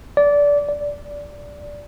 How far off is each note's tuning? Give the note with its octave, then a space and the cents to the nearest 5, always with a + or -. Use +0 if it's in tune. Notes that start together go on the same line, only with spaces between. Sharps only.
D5 -20
D5 -10